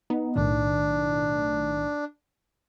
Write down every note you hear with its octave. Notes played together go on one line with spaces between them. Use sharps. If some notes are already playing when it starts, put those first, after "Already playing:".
B3 D#4
B1 A2 D#3 D4